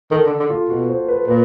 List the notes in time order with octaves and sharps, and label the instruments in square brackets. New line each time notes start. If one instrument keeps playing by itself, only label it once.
[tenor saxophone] D#3 [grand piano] A4
[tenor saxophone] D3
D3
[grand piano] F4
[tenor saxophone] B2 [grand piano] F#4
[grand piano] C5
B4
[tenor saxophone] A#2 [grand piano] B4